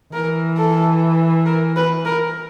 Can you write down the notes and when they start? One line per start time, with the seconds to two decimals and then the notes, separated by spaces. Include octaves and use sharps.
0.13 E3 A#4
0.57 A4
1.46 A#4
1.76 B4
2.06 A#4